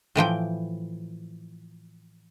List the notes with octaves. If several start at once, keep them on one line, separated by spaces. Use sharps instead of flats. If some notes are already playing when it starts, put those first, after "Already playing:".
A2 E3 F3 G5